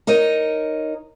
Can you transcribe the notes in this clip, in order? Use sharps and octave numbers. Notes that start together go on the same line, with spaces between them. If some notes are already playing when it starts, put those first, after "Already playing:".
D#4 A#4 C#5 D#5